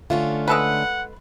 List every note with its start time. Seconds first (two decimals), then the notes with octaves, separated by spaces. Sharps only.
0.10 D3 A3 C#4 F4
0.48 G#3 A4 B4 F#5